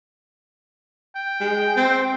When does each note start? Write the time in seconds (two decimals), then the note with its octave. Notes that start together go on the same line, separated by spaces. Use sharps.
1.16 G5
1.40 G#3
1.76 C4